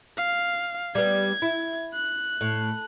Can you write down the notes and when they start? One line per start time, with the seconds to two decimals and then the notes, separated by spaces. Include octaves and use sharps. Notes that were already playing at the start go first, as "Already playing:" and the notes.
0.17 F5
0.95 G3 B3 G#6
1.42 E4
1.94 F#6
2.41 A2